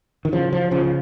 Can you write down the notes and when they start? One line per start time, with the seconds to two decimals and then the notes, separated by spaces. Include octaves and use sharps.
0.25 D#3
0.32 C#3 F3
0.53 F3
0.71 C#3 F3